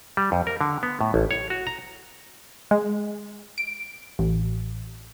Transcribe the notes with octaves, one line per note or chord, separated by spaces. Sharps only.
G3
F2
A#4
D3
B3
A2
A1
C#5
F#4
A#5
G#3
D7
A1